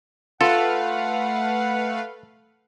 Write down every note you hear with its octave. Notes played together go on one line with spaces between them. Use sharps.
A3 F4 A4 B4 F5 F#5